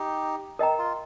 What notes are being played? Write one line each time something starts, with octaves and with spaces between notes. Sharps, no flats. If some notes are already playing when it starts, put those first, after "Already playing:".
Already playing: D#4 G4
A#4 D#5 G5 A#5
F4